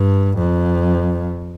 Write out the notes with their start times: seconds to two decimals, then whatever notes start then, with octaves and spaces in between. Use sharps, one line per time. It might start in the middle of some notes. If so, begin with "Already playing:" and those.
Already playing: G2
0.39 F2